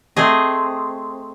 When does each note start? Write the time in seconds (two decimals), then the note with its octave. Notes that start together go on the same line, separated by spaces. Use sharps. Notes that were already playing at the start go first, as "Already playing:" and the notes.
0.16 A3 C4 G#4 D#5